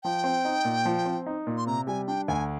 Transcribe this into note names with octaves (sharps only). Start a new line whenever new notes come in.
F3 G5
C4
D#4
A#2
F3
C4
D#4
A#2
C6
C3 A#5
G3 G#5
D4 G5
D2 G#5